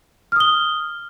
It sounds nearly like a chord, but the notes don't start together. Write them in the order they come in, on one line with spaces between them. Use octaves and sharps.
F6 D#6 G7